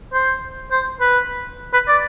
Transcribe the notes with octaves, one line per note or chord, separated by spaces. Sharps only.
C5
C5
B4
B4
D5